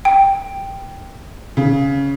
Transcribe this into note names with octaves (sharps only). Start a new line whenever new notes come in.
G5
C#3